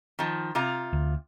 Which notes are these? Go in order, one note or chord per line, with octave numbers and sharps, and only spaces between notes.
D#3 F3
C3 F4 A#5
D2